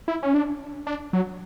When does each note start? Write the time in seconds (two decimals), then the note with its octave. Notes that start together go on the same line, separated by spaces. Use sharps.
0.08 E4
0.23 C#4
0.34 D4
0.87 D4
1.13 F#3